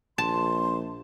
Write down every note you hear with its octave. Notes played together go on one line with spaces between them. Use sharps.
A#1 A5 C6